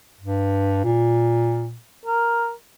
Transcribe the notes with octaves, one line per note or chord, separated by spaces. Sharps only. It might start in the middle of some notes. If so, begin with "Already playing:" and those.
G2
A#2
A#4